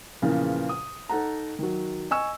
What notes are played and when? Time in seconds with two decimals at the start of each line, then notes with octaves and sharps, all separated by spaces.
0.22 E2 A#2 C#3 E3 F3
0.69 D#6
1.09 D#4 A4 F#5 A#5
1.59 D#3 F#3
2.11 D#5 G#5 C#6 E6